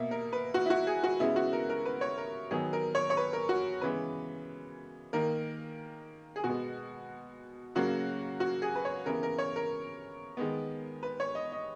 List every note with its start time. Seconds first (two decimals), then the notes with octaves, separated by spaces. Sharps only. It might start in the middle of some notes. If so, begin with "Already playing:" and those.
Already playing: B2 A#3 E5
0.11 A#4
0.32 B4
0.54 F#4
0.66 E4
0.70 F#4
0.87 G#4
1.04 F#4
1.20 C#3 G#3 B3 E4
1.36 F#4
1.53 A#4
1.69 A#4
1.85 B4
2.01 C#5
2.18 A#4
2.51 D#3 F#3 B3 G#4
2.73 A#4
2.95 C#5
3.10 C#5
3.17 B4
3.33 A#4
3.49 F#4
3.81 C#3 E3 G#3 B3 B4
5.13 D#3 A#3 A#4
6.36 G#4
6.43 B2 G#3 B3 F#4
7.75 C#3 F#3 A#3 F#4
8.40 F#4
8.62 G#4
8.75 B4
8.85 C#5
9.06 C#3 E3 B3 A#4
9.23 A#4
9.38 C#5
9.56 A#4
10.37 D#3 G#3 B3
11.03 B4
11.20 C#5
11.35 D#5
11.52 D#5